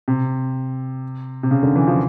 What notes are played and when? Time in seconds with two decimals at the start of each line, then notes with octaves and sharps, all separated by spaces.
0.08 C3
1.43 C3
1.51 C#3
1.63 D3
1.75 E3
1.88 F3